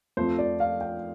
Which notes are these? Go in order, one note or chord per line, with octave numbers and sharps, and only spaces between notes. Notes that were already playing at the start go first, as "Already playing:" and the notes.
F2 F3 A3 C4 C5
D5
F5
G5